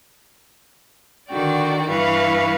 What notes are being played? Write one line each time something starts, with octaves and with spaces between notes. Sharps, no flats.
D3 D#3 F#4 D5 G5
G2 E3 B4 F5 C#6